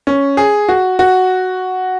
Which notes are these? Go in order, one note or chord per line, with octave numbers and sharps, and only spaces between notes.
C#4
G#4
F#4
F#4